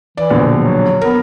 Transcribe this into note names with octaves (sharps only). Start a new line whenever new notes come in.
E3 D5
A#1 B2 D3
F#3
B3 A#4